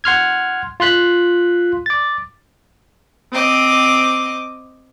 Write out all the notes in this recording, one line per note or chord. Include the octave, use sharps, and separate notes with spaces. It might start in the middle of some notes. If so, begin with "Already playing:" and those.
F#5 C6 F6 G#6
F4 C6 F#6 B6
D6 A6
C4 D#5 D6